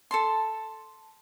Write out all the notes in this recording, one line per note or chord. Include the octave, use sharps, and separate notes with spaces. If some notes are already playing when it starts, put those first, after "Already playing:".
A4 A5 C6